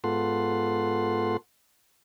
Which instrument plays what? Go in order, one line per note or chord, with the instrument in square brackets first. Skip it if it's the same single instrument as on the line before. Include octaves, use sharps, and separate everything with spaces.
[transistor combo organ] G#2 B3 F4 A4 F#5 C6